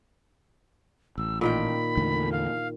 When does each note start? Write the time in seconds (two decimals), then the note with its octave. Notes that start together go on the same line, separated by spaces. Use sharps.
1.18 A1 E6
1.41 A#2 D#3 G5 B5
1.97 E2 D3 A3
2.32 F5